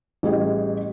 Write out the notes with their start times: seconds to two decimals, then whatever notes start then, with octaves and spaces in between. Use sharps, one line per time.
0.23 A1 G3 G4 G#4 D#5